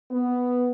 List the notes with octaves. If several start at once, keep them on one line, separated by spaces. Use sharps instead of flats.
B3